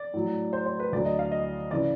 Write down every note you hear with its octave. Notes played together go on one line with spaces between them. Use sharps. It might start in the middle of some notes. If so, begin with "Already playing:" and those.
Already playing: D5
A2 F#3
C5
C5
B4
D2 D3 F#3 D5
D#5
F5
D#5
C#3 E3 D5